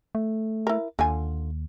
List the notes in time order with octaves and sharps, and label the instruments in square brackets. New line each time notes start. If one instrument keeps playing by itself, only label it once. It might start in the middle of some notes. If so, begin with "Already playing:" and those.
[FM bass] A3
[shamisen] E4 A#4
[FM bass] D#2 [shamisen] D3 F4 G#5